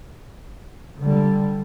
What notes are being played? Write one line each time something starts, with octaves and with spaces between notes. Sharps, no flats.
D3 G3